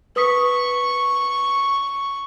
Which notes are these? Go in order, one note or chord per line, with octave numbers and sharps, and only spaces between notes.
B4 C#6 D#6 B6